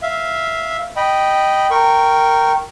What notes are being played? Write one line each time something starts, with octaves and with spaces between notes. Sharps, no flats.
E5 F5
D#5 G5 B5
A#4 G5 C#6